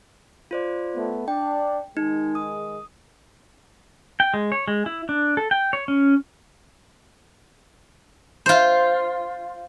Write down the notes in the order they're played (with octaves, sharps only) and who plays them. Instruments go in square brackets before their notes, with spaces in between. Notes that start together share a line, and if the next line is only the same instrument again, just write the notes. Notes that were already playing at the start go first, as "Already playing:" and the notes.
[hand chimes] F4 C5 D5
[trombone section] A3 B3
[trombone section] D4 [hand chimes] G5
[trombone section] D#3 G#3 [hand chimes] D#4
[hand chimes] D#6
[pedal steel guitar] G5
G#3
C#5
G#3
E4
D4
A4
G5
C#5
C#4
[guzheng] F4 C5